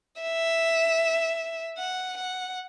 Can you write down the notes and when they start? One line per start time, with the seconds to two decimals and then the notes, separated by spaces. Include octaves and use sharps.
0.22 E5
1.78 F#5
2.17 F#5